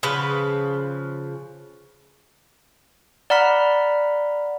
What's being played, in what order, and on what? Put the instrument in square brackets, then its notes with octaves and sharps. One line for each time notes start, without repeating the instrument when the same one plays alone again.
[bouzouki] C#3 F3 B4
[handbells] D5 F#5 A#5 B5 F6 B6